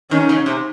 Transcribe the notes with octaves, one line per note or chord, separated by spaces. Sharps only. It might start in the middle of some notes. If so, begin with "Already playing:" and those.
D#3 C#4
C#3
C3